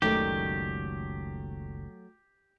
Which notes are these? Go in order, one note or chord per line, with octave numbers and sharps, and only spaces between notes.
F#1 C#2 D#3 F#3 A3 G4 D5